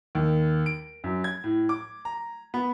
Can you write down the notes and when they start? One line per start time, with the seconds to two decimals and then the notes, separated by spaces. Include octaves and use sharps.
0.15 D#2
0.66 D7
1.04 F#2
1.24 G#6
1.44 A2
1.69 D6
2.05 A#5
2.54 B3